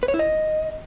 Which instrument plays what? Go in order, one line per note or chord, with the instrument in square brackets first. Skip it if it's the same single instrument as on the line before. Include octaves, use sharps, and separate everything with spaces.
[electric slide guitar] B4
C#5
E4
D#5